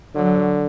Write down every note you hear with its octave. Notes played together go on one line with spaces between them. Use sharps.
D3 F#3